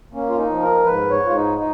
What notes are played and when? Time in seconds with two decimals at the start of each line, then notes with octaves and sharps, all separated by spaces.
0.13 A#3 C#4
0.29 F4
0.38 D#4
0.50 F3
0.63 A#4
0.86 G#2 B4
1.11 C#5
1.22 G#2 F4
1.35 D#4
1.59 D#4